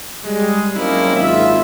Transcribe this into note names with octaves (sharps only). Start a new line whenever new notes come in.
G3 G#3
F#3 A#3 C4 C#4 D#4 E4
G#1 F4 E5